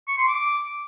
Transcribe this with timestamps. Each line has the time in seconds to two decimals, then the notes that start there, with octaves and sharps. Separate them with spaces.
0.08 C#6
0.18 C6
0.28 D6